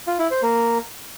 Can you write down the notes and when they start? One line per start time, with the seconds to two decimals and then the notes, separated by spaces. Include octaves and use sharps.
0.07 F4
0.19 E4
0.31 C5
0.43 A#3